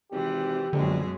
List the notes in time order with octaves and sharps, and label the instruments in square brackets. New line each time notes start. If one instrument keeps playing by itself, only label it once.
[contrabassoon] G#1 [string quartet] C3 E3 [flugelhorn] G4
[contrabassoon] A#1 [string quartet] F#2 B2 G#3 [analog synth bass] D3